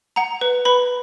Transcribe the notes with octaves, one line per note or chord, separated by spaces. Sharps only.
F#5 A#5
B4
B4 B5